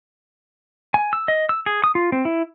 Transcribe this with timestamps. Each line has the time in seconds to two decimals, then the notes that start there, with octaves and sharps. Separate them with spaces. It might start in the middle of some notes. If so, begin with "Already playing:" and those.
0.94 G#5
1.13 E6
1.28 D#5
1.49 E6
1.66 G#4
1.84 D#6
1.95 F4
2.12 C4
2.25 E4